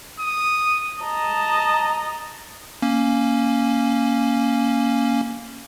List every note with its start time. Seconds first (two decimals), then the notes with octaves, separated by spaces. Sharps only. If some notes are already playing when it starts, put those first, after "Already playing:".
0.20 D#6
1.01 D#5 A5 A#5
2.82 A#3 C#4